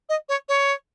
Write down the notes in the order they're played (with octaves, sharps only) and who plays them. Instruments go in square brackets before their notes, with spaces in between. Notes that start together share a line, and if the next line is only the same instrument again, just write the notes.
[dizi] D#5
C#5
C#5